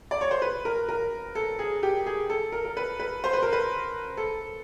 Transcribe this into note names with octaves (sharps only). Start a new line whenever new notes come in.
D5
C#5
C5
B4
A#4
A#4
A4
G#4
G4
G#4
A4
A#4
A#4
B4
B4
C5
B4
A#4
B4
A4